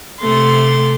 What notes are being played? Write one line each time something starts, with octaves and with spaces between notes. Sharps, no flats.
C3 A3 C6 A6